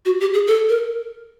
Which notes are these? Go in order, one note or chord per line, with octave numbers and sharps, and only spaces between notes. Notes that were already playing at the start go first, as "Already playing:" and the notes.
F#4
G4
G#4
A4
A#4